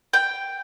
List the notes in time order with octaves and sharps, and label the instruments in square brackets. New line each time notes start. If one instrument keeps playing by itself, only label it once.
[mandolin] G5